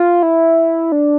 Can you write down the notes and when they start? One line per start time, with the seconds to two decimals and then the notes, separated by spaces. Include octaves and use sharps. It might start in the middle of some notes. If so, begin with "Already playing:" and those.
Already playing: F4
0.23 E4
0.92 D4